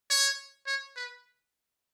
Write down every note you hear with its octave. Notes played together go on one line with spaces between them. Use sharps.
C#5
C#5
B4